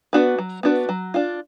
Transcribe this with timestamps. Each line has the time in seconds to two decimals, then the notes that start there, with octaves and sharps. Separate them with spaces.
0.13 B3 D4 F#4 B4
0.38 F#3
0.63 B3 D4 F#4 B4
0.89 F#3
1.14 D4 F4